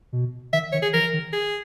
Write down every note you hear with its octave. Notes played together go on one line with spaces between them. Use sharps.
B2
D#3 E5
D#3 C#5
G#4
E3 A#4
D#3
G#4